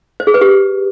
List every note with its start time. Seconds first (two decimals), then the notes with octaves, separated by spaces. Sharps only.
0.20 C5
0.27 G#4
0.34 B4
0.41 G4